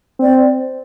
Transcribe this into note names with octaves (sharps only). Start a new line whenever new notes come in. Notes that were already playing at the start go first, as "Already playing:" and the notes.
C4 D5